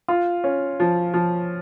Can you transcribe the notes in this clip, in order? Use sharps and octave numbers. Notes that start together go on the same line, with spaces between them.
F4
C#4
F3
F3